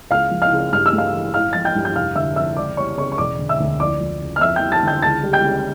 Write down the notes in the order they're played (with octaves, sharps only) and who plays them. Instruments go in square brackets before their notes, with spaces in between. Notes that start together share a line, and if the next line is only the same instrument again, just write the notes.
[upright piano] C#2 F5 F6
F3
F5 F6
C#3
G2 F6
E6
A3
F5 F6
E3
A1 F5 F6
F3 A6
G5 G6
G2
G6
F1 F5 F6
D3 E5 E6
F2 E5 E6
C#2 D5 D6
G3 C#5 C#6
C#3 C#5 C#6
C#6
E1 D5 D6
D3
E5 E6
D2
F2 D5 D6
F3
C#3
F6
F2 E5 E6
G5 G6
G3
A5 A6
D3 G5 G6
C#2 A5 A6
G3
G5 G6
C#3